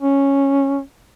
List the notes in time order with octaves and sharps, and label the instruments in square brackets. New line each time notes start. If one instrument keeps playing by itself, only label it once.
[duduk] C#4